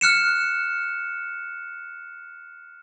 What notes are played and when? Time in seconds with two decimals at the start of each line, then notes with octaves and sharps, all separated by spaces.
0.01 F6 F#6 C#7 E7